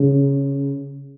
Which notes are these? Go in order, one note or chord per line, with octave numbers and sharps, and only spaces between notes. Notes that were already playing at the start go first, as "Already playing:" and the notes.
Already playing: C#3